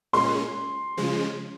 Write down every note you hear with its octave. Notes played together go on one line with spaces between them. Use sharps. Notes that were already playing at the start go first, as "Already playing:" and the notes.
A#2 G#3 C#4 C6
C#3 F3 G#3